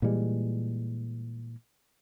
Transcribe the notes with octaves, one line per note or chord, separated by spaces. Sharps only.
A#2 E3 G3 G#3